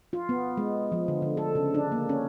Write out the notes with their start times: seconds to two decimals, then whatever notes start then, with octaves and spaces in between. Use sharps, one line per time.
0.13 F4
0.29 B3
0.57 G#3
0.92 F3
1.08 D3
1.22 D3
1.37 A4
1.55 C#3
1.74 D4
1.92 A#3
2.09 C#4